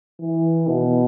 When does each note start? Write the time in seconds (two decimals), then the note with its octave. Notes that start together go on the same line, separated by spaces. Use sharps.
0.20 E3
0.68 B2